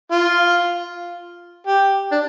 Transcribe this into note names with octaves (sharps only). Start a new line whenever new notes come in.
F4
G4
D4